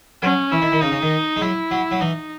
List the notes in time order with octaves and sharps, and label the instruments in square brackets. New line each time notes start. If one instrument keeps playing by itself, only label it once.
[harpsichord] F#3 [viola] C#4
[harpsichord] E3 [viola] E4
[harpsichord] D#3
D#3
[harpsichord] C#3 [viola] D#4
[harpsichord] C#3
D#3
G#3
[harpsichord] F#3 [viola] E4
[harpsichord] F#3
F#3
[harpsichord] E3 [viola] D#4